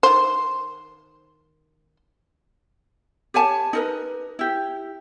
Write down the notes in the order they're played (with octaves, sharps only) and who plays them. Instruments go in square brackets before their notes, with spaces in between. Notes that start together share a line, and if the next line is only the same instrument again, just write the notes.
[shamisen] D#3 C5
[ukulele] G4 C#5 G#5 A5
D#4 A#4 B4
E4 G4